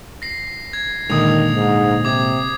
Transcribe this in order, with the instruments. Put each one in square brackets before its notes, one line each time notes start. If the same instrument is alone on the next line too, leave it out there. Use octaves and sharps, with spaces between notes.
[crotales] A#6 C7
G#6
[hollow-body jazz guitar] A#2 D3 G#3 [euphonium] D#3 [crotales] D#6 F7
[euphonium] G#2
[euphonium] C3 [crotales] D6 G#6